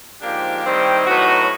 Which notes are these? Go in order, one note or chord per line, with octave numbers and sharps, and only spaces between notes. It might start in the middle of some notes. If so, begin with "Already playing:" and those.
G#2 F3 A#3 D4 G4
D#3 G3 C4 E4
A2 F#3 B3 D#4 F#4